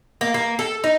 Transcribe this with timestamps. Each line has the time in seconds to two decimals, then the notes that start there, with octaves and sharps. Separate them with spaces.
0.21 A#3
0.34 A#3
0.59 A4
0.84 D#4